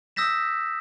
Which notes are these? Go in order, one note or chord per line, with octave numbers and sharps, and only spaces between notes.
D#6 E6 G6 A#6 B6 E7